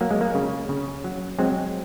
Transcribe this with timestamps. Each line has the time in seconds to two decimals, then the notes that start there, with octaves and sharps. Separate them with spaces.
0.01 F#3 A#3
0.11 G#3
0.21 A#3
0.35 C#3
0.69 C#3
1.04 F#3
1.39 F#3 G#3 C4